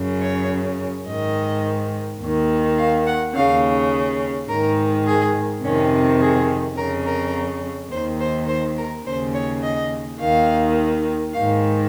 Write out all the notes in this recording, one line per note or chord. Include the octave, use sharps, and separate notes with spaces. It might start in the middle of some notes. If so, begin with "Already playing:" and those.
Already playing: F#2 C#3
C#5
G#2 D#3 D#5
D#2 D#3
F5
F#5
D#2 C#3 F5
G#2 D#3 A#4
G#4
F2 C3 D#3 C#4
G#4
F2 C#3 A#4
A#4
D#2 D#3 C5
C5
C5
A#4
D#2 C#3 C5
C#5
D#5
D#2 D#3 F5
G#2 D#3 F5